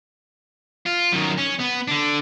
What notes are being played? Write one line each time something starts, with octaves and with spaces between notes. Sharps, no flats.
F4
F#2 D#3
C#4
B3
D3 D4